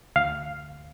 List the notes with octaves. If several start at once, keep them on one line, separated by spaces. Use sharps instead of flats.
D2 F5